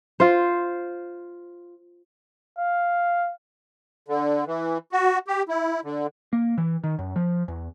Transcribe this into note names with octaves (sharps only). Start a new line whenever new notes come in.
F4 C5
F5
D3
E3
F#4
G4
E4
D3
A#3
E3
D#3
F#2
F3
E2